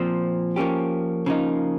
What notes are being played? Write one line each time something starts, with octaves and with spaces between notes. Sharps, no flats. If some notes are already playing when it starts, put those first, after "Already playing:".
Already playing: A#2 F3 C4
F3 A#3 C#4 G4
C#3 F3 A#3 D#4